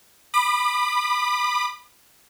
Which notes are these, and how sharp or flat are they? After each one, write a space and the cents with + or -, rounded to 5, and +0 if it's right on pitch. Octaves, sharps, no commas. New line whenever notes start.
B5 +0 D6 +45